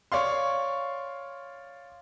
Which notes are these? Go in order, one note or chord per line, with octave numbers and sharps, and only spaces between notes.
C#5 D5 F5 C6